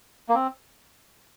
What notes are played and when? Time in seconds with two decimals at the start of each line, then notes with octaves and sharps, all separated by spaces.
0.29 A#3
0.35 C4